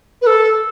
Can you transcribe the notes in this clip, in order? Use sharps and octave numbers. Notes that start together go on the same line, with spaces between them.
B4
A4